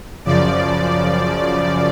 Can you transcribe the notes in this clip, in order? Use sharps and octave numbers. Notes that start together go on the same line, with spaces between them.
F#2 C#3 F3 D5